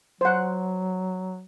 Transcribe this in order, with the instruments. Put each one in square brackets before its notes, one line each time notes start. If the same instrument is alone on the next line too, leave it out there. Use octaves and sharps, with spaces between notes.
[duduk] F#3 [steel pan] C5 F#5